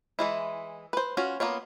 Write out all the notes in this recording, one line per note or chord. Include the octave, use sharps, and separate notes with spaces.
E3 G#3 E4
B4 C5
C#4 F4 F#4
A#3 B3 F4 C#5